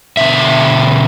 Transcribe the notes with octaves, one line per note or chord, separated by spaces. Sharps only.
B2 D3 E5